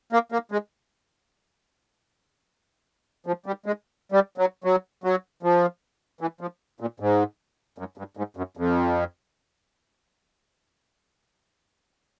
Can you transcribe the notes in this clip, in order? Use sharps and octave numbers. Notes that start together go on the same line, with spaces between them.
A#3
A#3
G#3
F3
G3
G#3
G3
F#3
F#3
F#3
F3
E3
F3
A#2
G#2
F#2
G2
G#2
F#2
F2